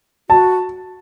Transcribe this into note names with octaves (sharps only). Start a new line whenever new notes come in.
F#4 A5